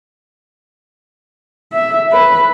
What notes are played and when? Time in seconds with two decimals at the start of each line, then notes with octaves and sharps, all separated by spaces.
1.73 E5
2.12 B4